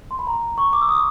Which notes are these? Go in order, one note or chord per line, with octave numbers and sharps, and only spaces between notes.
C6
B5
A#5
C#6
D6
E6
D#6